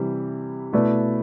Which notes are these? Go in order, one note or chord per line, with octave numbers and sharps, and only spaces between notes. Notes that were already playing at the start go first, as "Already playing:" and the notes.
Already playing: C3 E3 G3
B2 A3 E4 B4 D5